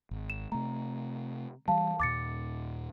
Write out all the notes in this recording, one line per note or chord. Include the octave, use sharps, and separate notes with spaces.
G#1
E7
C3 A3 A#5
E3 G3 F5 A5
D#2 A#2 D6 A6 C#7